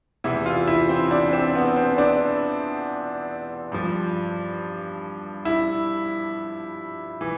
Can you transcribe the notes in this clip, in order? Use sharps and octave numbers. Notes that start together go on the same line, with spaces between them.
E2 C3 E3 E4
F4
E4
C4
D4
C4
B3
C4
D4
G2 F3
E4
E3